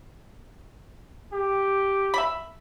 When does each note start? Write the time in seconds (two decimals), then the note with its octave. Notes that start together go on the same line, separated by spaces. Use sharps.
1.33 G4
2.14 E5 B5